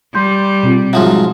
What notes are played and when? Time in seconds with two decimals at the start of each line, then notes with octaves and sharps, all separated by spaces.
0.15 G3 C6 G6
0.63 B2 C4 F4
0.93 G#2 F3 F#3 E5 C6